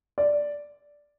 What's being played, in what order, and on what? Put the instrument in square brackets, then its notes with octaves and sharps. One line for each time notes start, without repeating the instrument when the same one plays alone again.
[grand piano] D5